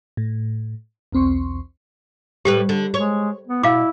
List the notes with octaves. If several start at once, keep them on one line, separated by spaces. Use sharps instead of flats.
A2
B1 E2 C4 C6 C#6
A2 G3 G4 B4
D3
G#3 C#5
B3
B2 E4 F5 D6